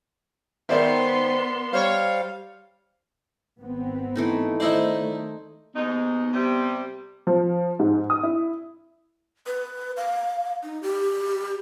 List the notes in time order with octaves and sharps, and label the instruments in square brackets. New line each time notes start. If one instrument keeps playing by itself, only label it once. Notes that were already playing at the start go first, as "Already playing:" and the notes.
[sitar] G#2 D#3 C5 [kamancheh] B3 C6 [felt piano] A#4 D5 E5
[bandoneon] G3 F5 [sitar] C5 C#5
[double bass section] G#1 B3 C4
[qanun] E3 A3 D#4
[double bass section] D#3 A3 [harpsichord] D#4 E4 D5 [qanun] C5 D#5 C6
[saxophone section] D#2 G#2 D#4 [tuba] B3
[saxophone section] C3 G3
[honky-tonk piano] F3
G#2
D#6
E4
[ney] B4
F5
D#4
G4